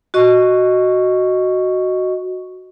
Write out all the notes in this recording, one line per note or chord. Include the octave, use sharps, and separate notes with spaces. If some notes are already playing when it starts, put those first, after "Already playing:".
F#4 D#5 C#6